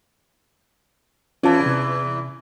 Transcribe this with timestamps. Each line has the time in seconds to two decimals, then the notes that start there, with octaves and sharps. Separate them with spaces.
1.43 E2 E3 C#4 F4 A5
1.66 C3